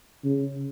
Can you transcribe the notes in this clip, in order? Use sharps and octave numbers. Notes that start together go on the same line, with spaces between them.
C#3